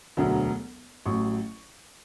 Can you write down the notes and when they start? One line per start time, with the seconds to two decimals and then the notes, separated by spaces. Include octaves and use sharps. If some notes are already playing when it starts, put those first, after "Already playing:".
0.17 E1 D2 D3 F#3
1.05 A1 A2 F#3 C#6